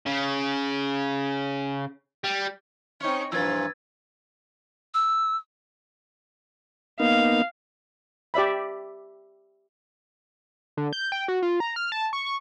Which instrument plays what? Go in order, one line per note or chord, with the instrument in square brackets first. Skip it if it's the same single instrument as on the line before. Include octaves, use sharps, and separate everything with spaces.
[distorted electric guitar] C#3
G3
[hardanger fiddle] C4 C#5 [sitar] C#4 D#4
[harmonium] G2 E3 [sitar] A#2 F3 [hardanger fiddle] B4 [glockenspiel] E6 G#6 A6
[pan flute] E6
[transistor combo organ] A#3 B3 D#4 [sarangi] F5
[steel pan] G4 D5 E5 B5
[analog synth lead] D3
G6
G5
F#4
F4
A#5
F6
A5
C#6
C#6